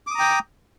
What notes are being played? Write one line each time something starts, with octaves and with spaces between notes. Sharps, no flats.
G5 A#5 D6 D#6